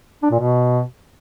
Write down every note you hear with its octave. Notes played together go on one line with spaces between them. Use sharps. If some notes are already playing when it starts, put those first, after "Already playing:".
D4
A#2
B2